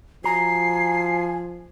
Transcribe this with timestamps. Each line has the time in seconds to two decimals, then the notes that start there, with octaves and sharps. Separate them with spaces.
0.24 F3 F#4 G#5 A#5 C7